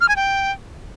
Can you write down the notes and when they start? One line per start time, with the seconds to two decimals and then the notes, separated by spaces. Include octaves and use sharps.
0.01 F6
0.09 G#5
0.16 G5